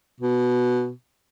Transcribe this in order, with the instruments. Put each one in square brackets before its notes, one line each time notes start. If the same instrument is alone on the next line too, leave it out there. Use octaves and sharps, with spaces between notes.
[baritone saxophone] B2